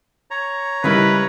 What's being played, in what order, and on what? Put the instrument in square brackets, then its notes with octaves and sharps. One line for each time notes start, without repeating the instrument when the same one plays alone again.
[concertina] C#5 A#5
[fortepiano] C#3 E4 A#4 [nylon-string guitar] G3 G#3 D#5 [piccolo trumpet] B4